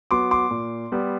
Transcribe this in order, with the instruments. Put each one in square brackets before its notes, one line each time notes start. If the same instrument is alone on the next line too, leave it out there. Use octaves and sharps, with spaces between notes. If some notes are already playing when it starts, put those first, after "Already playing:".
[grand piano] F#3 B3 C6 D6
C6 D6
A#2
G3 B3